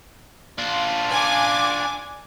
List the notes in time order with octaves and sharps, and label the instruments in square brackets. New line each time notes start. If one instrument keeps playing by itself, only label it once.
[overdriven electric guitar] D4 F4
[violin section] G#5 D6